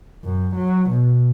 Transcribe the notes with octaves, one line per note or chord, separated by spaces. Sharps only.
F#2
F#3
B2